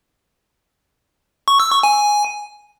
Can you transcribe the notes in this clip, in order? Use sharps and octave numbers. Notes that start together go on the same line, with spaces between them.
C#6
E6
C#6
G#5